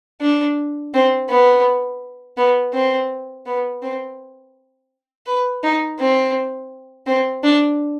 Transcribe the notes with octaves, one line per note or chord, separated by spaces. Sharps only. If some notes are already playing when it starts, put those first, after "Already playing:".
D4
C4
B3
B3
C4
B3
C4
B4
D#4
C4
C4
D4